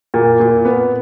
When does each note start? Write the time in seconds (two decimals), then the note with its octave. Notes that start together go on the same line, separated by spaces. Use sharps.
0.14 A#2
0.40 A#2
0.65 B3